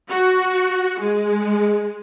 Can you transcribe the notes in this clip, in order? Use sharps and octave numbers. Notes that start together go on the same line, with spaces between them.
F#4
G#3